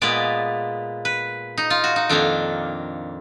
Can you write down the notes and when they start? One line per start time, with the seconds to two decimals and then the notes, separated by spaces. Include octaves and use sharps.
0.02 A#2 G#3 B3 D5
1.05 B4
1.58 D#4
1.70 F4
1.84 F#4
1.96 D#4
2.10 F2 D#3 A#3 D4